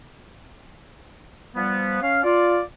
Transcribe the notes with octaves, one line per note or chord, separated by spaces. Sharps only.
F3 G3 B3
C#4 F5
F4 D5